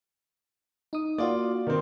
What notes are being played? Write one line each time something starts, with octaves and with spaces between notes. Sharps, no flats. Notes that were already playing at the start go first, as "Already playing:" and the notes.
D#4 D#6
A#3 F4 F#4 D5
D#3 C4